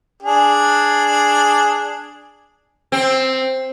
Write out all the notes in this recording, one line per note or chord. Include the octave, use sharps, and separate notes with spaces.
D4 G#4
C4